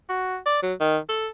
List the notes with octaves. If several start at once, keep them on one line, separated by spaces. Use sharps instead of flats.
F#4
D5
F#3
D#3
A4